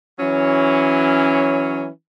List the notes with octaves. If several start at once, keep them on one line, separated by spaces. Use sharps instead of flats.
E3 F#3 C#4